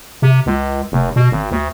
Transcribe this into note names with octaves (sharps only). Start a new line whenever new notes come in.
C3
C#2
F1
B2
G#1
D2